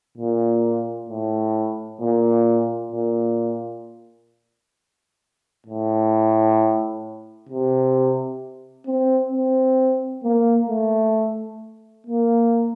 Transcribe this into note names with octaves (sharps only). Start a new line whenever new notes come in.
A#2
A2
A#2
A#2
A2
C3
C4
C4
A#3
A3
A#3